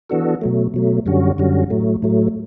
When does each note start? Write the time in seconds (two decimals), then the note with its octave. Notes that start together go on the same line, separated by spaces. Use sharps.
0.10 E3 B3 D4 F#4 A4
0.41 B2 F#3 A3
0.74 B2 F#3 A3
1.06 F#2 D3 G3 C#4 F#4
1.38 F#2 D3 G3 C#4 F#4
1.70 A2 F#3 A3
2.02 A2 F#3 A3